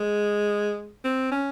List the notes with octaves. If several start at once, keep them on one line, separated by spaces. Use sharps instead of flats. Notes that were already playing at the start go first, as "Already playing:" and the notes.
Already playing: G#3
C4
C#4